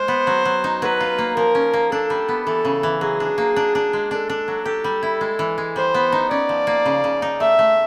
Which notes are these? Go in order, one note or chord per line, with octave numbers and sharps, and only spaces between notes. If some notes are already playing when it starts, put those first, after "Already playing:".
Already playing: G#3 C5
B3
F#3
F#3
D#4
F#3 B4
F4
A#3
F3 A#4
C#4
A#3
D4 A4
G3
B3
E3 A4
C#3
E3
F#3 G#4
D4
A#3
D4
D4
G#3
D4 A4
D4
F#3
G4 A4
G3
E4
G#3
E3
G#3
G3 C5
B3
D#4
C#4 D5
F3
A#3
C#3
C#3
D#4
A3 E5
A3